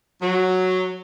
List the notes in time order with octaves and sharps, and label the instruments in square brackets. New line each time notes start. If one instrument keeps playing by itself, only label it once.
[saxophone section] F#3